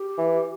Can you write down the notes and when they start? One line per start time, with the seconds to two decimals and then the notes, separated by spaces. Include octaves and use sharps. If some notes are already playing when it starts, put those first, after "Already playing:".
Already playing: G4
0.18 E3